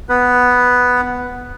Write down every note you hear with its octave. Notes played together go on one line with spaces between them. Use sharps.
B3 B4